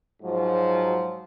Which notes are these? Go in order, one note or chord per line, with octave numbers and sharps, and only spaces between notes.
G#2 F3 F#3